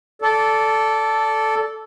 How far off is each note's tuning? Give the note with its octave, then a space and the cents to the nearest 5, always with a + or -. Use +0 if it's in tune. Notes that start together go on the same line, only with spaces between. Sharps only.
A4 +0 D5 -20